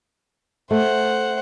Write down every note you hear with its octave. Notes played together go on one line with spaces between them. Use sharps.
A3 C5 F#5